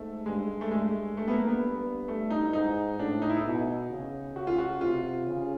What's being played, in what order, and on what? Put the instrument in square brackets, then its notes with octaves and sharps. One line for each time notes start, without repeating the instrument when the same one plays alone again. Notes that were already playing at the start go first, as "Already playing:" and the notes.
Already playing: [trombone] G#2 [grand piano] A3
[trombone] G2 [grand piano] G#3
[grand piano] A3
[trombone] G2 [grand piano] G#3
[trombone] G2 [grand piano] A3
[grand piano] B3
A#3
B3
A3
D#4
[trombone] G#2 [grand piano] D#4
[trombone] A2 [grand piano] D4
[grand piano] D#4
E4
D#4
[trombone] B2
C#3
[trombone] C#3 [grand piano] F#4
[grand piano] F4
F#4
[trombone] C3 [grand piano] F4
[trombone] C#3